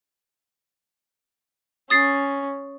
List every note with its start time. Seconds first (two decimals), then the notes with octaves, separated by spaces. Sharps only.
1.90 C#4 D#6 A6 C7